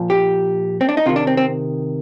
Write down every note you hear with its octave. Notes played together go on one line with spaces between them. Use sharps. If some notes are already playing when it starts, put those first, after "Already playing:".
Already playing: A#2 F3
G4
C4
D4
D#4
C3 D#3 F4
D4
C4
C4